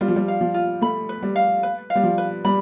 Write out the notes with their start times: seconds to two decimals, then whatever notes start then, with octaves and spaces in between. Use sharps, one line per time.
0.01 G3 F4
0.08 F3
0.16 G3
0.28 F5
0.41 F3
0.54 F4
0.81 A3 B5
1.09 B4
1.22 G3
1.36 F5
1.63 B4
1.90 F5
1.95 G3
2.03 F3
2.18 B4
2.45 G3 B5